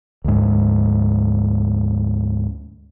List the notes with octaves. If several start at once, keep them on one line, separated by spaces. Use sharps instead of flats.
D2 G#2